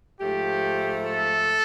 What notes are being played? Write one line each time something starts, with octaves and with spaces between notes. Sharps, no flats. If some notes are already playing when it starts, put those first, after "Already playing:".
G#2 F3 A3 G4
A4